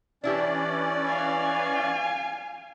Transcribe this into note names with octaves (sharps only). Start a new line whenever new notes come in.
E3 C#4 D4 E4 G4 D5
F5 G#5